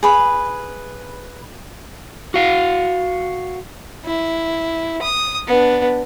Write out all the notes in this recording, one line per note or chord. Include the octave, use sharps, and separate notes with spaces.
G#4 B4 B5
F#4 F5 F#5
E4
D#6
B3 D4